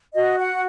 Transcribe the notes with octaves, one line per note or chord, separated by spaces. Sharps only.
F#4 D#5
F#5